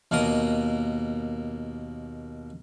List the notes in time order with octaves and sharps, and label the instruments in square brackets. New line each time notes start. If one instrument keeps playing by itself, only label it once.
[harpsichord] D#2 B2 A#3 A#4 D#6